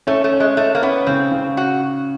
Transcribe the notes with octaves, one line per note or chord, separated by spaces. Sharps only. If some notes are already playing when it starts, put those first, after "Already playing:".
A3 C#4
A3
C#4
G#3
A3 C#4
A#3
B3 C#4
C#3 C4
C#3
F#4